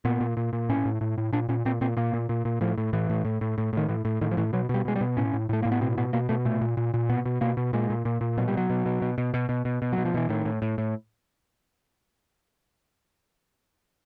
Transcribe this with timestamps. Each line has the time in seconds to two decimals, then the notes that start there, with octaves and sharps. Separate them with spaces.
0.05 A#2 B3
0.20 A#2
0.37 A#2
0.53 A#2
0.69 A2 C#4
0.85 A2
1.01 A2
1.18 A2
1.33 A#2 D4
1.49 A#2 C#4
1.65 A#2 C4
1.81 A#2 C4
1.97 A#2 A#3
2.14 A#2
2.29 A#2
2.45 A#2
2.61 A2 F3
2.78 A2
2.93 A2 E3
3.09 A2
3.25 A2
3.41 A2
3.58 A2
3.73 A2 D#3
3.89 A2 E3
4.05 A2
4.21 A2 D#3
4.31 F3
4.37 A2 E3
4.53 B2 F#3
4.69 B2 G3
4.85 B2 G#3
4.96 G3
5.01 B2
5.17 A2 C#4
5.34 A2
5.49 A2 A3
5.62 A2 A#3
5.72 B3
5.81 B2 C4
5.98 B2 B3
6.13 B2 A#3
6.29 B2 A3
6.45 A#2 A3
6.61 A#2
6.77 A#2
6.94 A#2
7.09 B2 B3
7.25 B2
7.41 B2 A#3
7.57 B2
7.73 A#2 G#3
7.90 A#2
8.05 A#2
8.21 A#2
8.38 B2 F#3
8.48 G3
8.53 B2 F#3
8.70 B2
8.86 B2
9.02 B2
9.18 B2
9.34 B2
9.49 B2
9.65 B2
9.82 B2
9.93 F#3
9.98 B2
10.05 F3
10.14 B2 E3
10.29 A2 D#3
10.45 A2
10.62 A2
10.78 A2